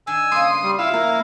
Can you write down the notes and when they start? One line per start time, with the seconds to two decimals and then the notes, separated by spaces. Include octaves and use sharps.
0.07 D#3 D4 G#5 E6
0.32 C#3 F3 A#3 C6 D#6
0.63 G3
0.79 E4 F4 E5 F5
0.93 F3 A#3